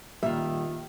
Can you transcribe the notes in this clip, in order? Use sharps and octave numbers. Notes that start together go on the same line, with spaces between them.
A#2 D#3 G3 F4 E5